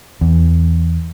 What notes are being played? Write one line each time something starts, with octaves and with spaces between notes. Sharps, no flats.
E2